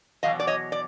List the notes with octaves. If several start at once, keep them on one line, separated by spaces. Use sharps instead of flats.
E2 B2 F#3 D#5 F5
D5
C#5 D#5
D5